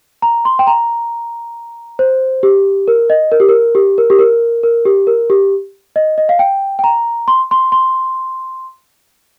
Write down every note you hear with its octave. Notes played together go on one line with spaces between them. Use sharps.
A#5
C6
G5
A#5
C5
G4
A#4
D#5
A#4
G4
A#4
G4
A#4
G4
A#4
A#4
G4
A#4
G4
D#5
D#5
F5
G5
G5
A#5
C6
C6
C6